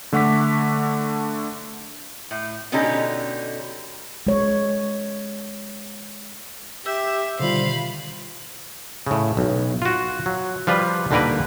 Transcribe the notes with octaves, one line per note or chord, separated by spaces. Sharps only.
D3 A3 F#5 C#6 D6 B6
A2
B2 D3 C#4 D#4 G4 A4
G#3 C#5
G4 E5 E6 G6
B2 D3 D#3 G3 F4 C5 F5 B5
A2 C#3
B1
F4 F#4
F#3
F3 G3 F4 B4
D#2 D3 G3 A#3 A#4 B4